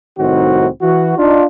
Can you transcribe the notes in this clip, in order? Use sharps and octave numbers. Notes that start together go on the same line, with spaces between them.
C2 A2 D#3 C4 D#4 F#4
E3 F#4
D4 D#4 F4